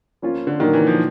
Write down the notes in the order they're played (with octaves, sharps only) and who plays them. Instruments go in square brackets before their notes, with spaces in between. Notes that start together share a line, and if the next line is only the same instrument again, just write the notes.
[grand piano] F3 A#3 C#4 F4
[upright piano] D3
[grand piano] A#2 F#3 A#3 [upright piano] D#3
[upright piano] E3
F3